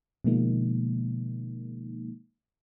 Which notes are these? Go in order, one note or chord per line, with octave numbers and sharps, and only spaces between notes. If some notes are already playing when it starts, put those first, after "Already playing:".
B2 D3 F3 G#3 A#3 D#4